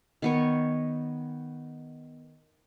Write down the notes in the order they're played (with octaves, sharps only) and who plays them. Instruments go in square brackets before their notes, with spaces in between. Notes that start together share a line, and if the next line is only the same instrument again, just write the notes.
[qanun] D#3 B3 C#5